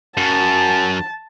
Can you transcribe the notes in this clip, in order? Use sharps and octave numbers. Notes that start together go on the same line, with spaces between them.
F#2 A5